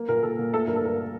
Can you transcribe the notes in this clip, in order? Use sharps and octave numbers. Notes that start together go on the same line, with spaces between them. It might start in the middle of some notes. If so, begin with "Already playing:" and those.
Already playing: A#3
A#2 A#4
A#2 A4
A#2
A3 A4
G2 A#4
A4
G2 A#4